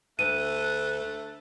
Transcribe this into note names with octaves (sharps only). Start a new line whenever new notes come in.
D2 A3 F#6 D#7